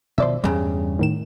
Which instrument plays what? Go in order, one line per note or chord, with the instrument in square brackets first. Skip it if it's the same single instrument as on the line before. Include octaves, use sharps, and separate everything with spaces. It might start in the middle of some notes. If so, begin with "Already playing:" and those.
[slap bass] B2 D#3 F3 [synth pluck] C5 D5 E5
[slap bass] E2 [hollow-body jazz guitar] G2 C#3
[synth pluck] A2 D#3 E7